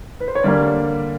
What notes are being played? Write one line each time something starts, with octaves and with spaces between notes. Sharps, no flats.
B4
C5
C#5
D3 G3 A#3 D5